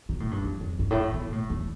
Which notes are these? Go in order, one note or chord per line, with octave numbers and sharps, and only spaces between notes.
B2
A2
G2
F2
F2
G2
A2
B2
A2
E2